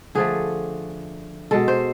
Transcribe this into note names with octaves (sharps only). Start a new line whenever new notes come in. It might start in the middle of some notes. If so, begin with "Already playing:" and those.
D3 F3 A3 G#4
B2 G#3 A4
C5